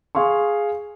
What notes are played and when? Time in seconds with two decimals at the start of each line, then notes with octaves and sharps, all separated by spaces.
0.15 G#4 F5 C6 C#6